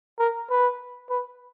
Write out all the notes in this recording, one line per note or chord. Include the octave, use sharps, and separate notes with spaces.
A#4
B4
B4